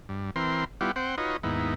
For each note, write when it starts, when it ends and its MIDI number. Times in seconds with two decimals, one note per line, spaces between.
0.09 0.30 43
0.36 0.64 52
0.36 0.64 60
0.36 0.64 70
0.36 0.64 84
0.81 0.91 55
0.81 0.91 59
0.81 0.91 64
0.81 0.91 65
0.81 0.91 67
0.81 0.91 78
0.96 1.16 60
0.96 1.16 72
0.96 1.16 78
0.96 1.16 79
1.18 1.37 63
1.18 1.37 65
1.18 1.37 66
1.18 1.37 71
1.18 1.37 73
1.18 1.37 75
1.43 1.74 39
1.43 1.74 44
1.43 1.74 59
1.43 1.74 63
1.43 1.74 64